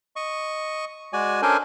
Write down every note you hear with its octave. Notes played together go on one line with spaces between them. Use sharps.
D#5 C#6
G#3 F#4 D5 G#5
C#4 D4 A4 A#4 C5 G#5